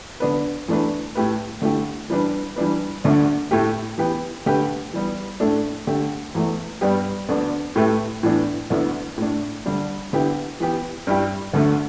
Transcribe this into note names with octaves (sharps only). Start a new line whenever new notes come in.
D3 B3 D4 B4
E2 E3 A3 D4 B4
A2 A3 G4 B4
D3 A3 E4 G4
E3 G3 D4 B4
E3 G3 D4 B4
D2 D3 A3 D4
A2 A3 G4
E3 B3 G4 B4
D3 A3 G4 B4
E3 G3 B3
A2 A3 D4 A4
D3 A3 G4
E2 E3 A3
G2 G3 B3 G4
D2 D3 B3 D4
A2 A3 G4 B4
A2 E3 B3 D4
D2 D3 B3 E4
A2 A3 D4
D3 G3 D4
D3 B3 E4 G4 B4
E3 B3 G4
G2 G3 E4 G4
D2 D3 A3